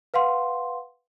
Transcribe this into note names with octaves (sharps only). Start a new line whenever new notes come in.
B4 F5 F#5 C6